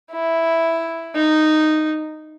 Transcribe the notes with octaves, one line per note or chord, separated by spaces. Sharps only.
E4
D#4